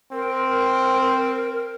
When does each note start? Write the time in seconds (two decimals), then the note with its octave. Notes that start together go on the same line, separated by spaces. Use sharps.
0.12 C4 A#4